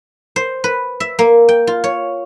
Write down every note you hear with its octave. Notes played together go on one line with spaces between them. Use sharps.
C5
B4
E5
A#3
G5
F4
C#5